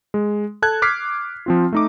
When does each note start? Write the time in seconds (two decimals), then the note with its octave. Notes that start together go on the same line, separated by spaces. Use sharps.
0.14 G#3
0.62 A4 A5 F#6 G#6
0.82 D6 F6 B6 C7
1.46 F3 C4 F4
1.72 A3 D#4 D6